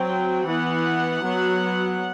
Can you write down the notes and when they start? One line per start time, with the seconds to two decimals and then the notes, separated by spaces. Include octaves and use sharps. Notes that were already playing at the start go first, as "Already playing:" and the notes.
Already playing: F#3 C4 G5
0.48 E3 B3 F#5
1.25 F#3 B3